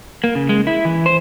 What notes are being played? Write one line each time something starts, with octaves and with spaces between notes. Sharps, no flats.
A#3
C#3
G#3
E4
E3
C5